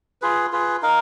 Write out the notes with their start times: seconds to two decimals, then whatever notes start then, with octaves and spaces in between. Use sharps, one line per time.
0.22 F4 G#4 B4
0.52 F4 G#4 B4
0.82 D#4 A#4 F5